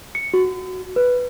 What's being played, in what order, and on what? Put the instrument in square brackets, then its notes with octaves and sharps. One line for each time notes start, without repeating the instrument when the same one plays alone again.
[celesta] C#7
F#4
B4